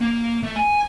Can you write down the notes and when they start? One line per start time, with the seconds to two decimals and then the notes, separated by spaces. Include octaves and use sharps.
0.01 A#3
0.43 A3
0.56 G#5